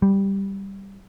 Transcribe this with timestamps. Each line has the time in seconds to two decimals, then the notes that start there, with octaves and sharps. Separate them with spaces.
0.02 G3